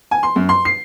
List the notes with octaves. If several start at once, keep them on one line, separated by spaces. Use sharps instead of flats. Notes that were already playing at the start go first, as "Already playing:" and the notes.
G#5
C6
F#2
C6
C7